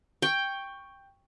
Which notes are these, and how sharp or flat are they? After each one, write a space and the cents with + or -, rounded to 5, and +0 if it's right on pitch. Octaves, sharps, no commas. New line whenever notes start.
G5 +10 C#6 +0